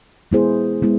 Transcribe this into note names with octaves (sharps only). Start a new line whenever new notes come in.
G#3 B3 E4 G#4 C5
G#3 B3 E4